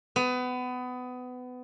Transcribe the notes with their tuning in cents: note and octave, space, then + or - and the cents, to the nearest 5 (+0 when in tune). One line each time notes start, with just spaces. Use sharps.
B3 +25